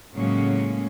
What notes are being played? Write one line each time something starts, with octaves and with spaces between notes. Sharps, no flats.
A2 C#3 F#3 G#3 A#3 C#4